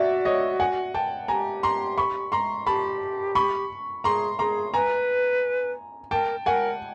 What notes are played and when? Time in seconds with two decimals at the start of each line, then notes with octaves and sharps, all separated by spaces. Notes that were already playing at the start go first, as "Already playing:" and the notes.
Already playing: F#4 D5 E5
0.25 C#5 D#5
0.60 F#5 G#5
0.94 G5 A5
1.28 G4 G#5 A#5
1.63 A#5 C6
1.98 B5 C#6
2.32 A#5 C6
2.67 G4 A5 B5
3.35 B5 C#6
4.04 G#4 A#5 C6
4.39 G#4 A#5 C6
4.74 B4 G#5 A#5
6.11 A#4 G5 A5
6.46 A#4 F#5 G#5